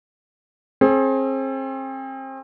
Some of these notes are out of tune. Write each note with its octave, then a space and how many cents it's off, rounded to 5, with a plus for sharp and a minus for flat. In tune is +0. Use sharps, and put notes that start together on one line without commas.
C4 +35 G#4 +35